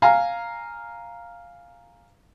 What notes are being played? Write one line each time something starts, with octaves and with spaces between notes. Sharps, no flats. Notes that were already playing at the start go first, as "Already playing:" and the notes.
F5 G#5 A#5